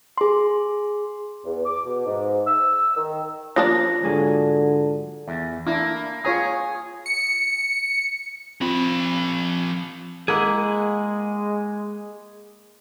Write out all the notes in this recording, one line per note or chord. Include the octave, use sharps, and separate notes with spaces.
G#4 C6
E2
D6
B2
G#2
E6
D#3
F3 A#3 C#4 D4 F4 C#5 A#6
G#2 D3 F#3 G#4
E2
A#3 D4 E4
F4 G#4 C#5 A#5
C#7
F3 C4 F4 B5
G#3 A#3 E4 G#4 F#5